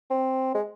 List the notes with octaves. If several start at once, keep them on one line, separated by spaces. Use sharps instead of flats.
C4
G#3